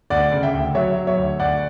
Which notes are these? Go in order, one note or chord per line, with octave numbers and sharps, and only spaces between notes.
D2 D5 F#5
C#3
E5 G5
D2
F#3 C#5 E5
F#3
C#5 E5
D2
D2 D5 F#5